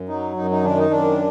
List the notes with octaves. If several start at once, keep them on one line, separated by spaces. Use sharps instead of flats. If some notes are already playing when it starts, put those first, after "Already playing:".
Already playing: F#2
F#3 D#4
F#2 D#4
D#4
D#3 D4
D#4
F#2 D4